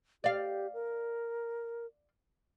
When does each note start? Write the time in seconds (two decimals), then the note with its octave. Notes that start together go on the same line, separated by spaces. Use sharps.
0.24 G4 D5 F5
0.74 A#4